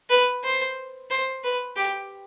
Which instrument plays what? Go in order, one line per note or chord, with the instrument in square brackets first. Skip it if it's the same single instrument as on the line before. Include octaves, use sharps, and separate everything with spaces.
[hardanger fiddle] B4
C5
C5
B4
G4